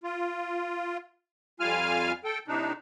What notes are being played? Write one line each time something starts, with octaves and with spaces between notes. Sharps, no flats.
F4
F2 G3 F4 F5 G#5 F6
A4 G5
A2 C3 D4 D#4